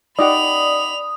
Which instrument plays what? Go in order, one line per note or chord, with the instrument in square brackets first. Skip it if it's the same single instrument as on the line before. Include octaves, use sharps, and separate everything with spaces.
[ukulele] D#4 G4 F#5 [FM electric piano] D5 [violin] B5 F7 [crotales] D#6